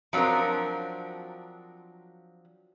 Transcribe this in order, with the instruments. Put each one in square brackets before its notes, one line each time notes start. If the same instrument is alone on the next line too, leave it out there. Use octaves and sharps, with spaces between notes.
[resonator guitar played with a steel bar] F3 F#3 C4 D4 A#4